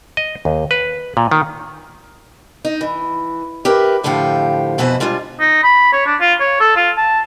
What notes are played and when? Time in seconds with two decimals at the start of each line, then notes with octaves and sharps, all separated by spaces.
0.17 D#5
0.45 D#2
0.71 B4
1.17 A#2
1.31 D#3
2.65 D#4
2.81 E3
3.65 G4 A#4 B4 E5
4.03 F2 A2 D3 F3 G4 F5
4.78 F2 B2 E3 B4 C5 A5
5.00 G3 G#3 D4 F4
5.40 D#4
5.63 B5
5.93 C#5
6.06 D4
6.20 F4
6.40 C#5
6.60 A4
6.76 F4
6.97 A5